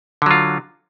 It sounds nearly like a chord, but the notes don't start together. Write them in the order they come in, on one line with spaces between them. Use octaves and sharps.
D3 F#3 F4